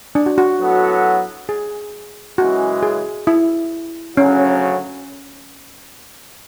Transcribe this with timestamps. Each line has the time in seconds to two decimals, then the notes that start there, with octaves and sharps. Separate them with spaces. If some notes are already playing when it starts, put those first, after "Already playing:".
0.15 D4
0.26 F#4
0.38 F#4
0.60 A2 F#3 B3 F#4 A4
1.49 G#4
2.38 F#2 C#3 E3 G#3 F#4
2.83 G#4
3.27 E4
4.17 D2 C#3 F#3 C#4